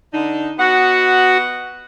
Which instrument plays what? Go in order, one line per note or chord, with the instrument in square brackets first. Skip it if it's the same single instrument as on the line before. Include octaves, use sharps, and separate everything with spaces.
[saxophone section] D3 D4 D#4
[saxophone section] B3 D#5 F#5 [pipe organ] F#4